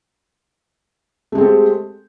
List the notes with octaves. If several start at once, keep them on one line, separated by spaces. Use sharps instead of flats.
G#3 A3 C4 G4 A4